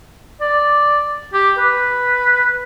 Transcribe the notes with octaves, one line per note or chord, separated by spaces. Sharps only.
D5
G4
B4